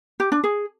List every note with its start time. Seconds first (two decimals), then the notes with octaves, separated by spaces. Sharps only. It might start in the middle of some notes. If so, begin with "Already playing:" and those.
0.20 G4
0.32 D4
0.44 G#4